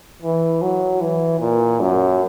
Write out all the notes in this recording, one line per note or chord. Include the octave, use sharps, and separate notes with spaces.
E3
F#3
E3
A#2
F#2